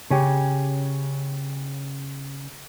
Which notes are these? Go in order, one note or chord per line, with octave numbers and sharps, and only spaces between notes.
C#3 C#4 G4